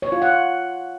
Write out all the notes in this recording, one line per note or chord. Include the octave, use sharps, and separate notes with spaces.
C#5
F4
F#5